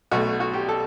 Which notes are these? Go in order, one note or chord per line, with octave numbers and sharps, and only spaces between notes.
B1 B2 A3 F#4
F#4
G4
A4